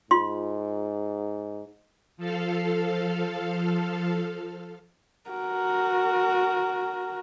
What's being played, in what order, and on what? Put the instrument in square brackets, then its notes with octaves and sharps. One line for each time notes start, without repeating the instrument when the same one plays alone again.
[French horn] G#2 [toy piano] F4 C6
[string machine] F3 A4 F5
[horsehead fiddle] F#4 A#4